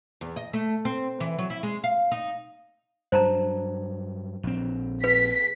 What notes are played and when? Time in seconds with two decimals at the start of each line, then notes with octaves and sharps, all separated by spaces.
0.21 E2
0.36 D#5
0.53 A3
0.85 C4
1.20 E3
1.39 F#3
1.50 E4
1.63 G#3
1.84 F5
2.12 D#4
3.12 G2 F#3 C5 A5 A#5
4.43 A#1 C4
5.04 B4 B6